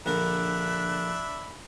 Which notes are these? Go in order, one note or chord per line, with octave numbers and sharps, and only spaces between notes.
A#1 D3 D4 A#4 E5 B5 F#6